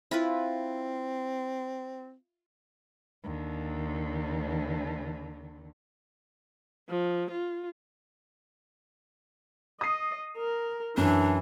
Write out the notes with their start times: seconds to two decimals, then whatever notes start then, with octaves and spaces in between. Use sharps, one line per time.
0.11 C4 E4 F4 B4
3.24 D#2 D3
6.89 F3
7.31 F4
9.81 D#5 D#6 C7
10.38 A#4
10.97 F#2 E3 D4